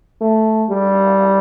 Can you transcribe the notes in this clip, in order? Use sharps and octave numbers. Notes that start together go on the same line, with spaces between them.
A3
G3